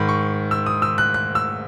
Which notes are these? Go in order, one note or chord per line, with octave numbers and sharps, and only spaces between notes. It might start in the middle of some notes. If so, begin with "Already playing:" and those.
Already playing: G#2 D#3 B5
C#6
E6
D#6
E6
F#6
F#6
E6